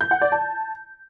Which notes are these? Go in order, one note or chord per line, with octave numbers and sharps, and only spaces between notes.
G6
F#5
D5
A5